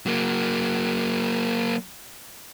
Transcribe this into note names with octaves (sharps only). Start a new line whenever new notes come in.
F#3 A#3